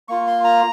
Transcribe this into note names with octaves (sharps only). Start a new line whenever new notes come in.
A#3 F4 C#6
C6
A#5